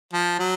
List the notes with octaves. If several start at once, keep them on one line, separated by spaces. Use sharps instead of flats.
F3
F#3